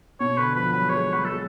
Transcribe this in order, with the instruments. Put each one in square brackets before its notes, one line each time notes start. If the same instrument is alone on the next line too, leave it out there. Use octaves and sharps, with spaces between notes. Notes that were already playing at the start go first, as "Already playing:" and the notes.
[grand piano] B2 [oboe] C#5
[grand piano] D3 [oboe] B4
[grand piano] F3 [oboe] B4
[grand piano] F#3 [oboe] B4
[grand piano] G#3 [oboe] C#5
[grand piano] F#3 [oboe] B4
[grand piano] G#3 [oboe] A4